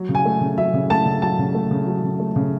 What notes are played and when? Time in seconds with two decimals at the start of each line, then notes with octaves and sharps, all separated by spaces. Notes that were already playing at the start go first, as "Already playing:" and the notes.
Already playing: F#3
0.09 C#3
0.15 G#5
0.25 A3
0.41 C#3
0.58 F#3 E5
0.74 C#3
0.90 A3 A5
1.06 C#3
1.22 F#3 A5
1.39 C#3
1.55 A3
1.71 C#3
1.87 F#3
2.04 C#3
2.20 A3
2.36 C#3